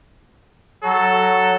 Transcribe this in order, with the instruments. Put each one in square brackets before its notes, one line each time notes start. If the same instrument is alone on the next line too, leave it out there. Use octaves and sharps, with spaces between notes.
[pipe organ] F#3 [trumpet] A4